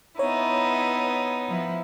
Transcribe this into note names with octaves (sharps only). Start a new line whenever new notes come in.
B3 D#4 E4 C#5
F3 E4